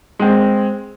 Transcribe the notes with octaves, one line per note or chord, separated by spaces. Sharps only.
G#3 C4